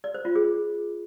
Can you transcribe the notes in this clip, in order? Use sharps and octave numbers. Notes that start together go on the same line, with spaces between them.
D5
C5
F4
G#4